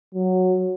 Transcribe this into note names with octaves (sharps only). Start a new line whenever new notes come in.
F#3